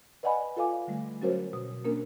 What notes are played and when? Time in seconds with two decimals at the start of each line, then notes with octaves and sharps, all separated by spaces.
0.23 B4 D5 D#5 F#5 G#5 B5
0.56 F4 A4 B4 F5 G#5 D6
0.87 D3 G3 A3
1.22 F#3 C#4 F#4 A#4 C5 C#5
1.53 B2
1.85 A#3 C#4 D4 A#4